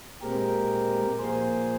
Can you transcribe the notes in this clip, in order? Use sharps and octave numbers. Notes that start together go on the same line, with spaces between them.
A#2 G#3 C4 G4 A#4
A#2 F3 A#3 G#4 C5